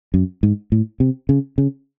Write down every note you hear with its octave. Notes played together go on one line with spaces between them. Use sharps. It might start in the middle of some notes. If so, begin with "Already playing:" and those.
F#2
G#2
A2
C3
C#3
C#3